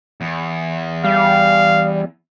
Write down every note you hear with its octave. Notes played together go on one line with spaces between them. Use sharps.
E2
G3 F5